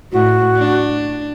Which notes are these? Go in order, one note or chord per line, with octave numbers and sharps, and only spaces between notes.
A2 F#4
D4